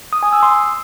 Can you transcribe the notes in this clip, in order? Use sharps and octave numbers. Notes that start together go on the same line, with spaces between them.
D#6
G#5
E6
C6